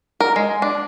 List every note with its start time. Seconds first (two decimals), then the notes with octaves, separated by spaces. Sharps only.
0.20 A#4
0.36 G#3
0.62 D4